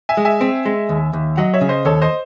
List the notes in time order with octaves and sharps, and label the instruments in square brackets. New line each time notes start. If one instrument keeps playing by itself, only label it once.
[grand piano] E5 G#5
[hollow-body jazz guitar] G#3
[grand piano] E5 G#5
[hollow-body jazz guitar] C4
G#3
D#2
D#2
[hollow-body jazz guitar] F#3 [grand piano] D#5 F#5
[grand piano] C#5 E5
[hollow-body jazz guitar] C#3
[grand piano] C5 D#5
[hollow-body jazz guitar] D#2 [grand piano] A4 C#5
[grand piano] C5 D#5